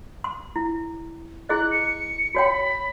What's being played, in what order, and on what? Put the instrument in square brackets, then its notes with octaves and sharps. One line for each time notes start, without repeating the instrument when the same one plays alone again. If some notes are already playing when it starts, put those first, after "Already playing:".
[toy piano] C6
E4
[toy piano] E4 G#4 D#5 [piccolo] F#6
[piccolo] C#7
[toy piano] F#4 C#5 G5 [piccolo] B5